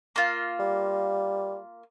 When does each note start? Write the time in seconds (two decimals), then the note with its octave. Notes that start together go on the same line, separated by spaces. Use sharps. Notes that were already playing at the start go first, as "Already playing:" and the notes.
0.16 A#3 F4
0.60 G3